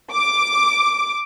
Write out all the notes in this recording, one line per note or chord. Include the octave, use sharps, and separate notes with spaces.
D6